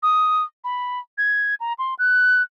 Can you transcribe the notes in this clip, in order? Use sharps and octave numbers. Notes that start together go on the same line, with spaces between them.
D#6
B5
G#6
A#5
C6
F#6